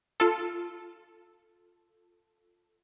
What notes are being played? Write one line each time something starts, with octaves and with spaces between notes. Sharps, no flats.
F4 A4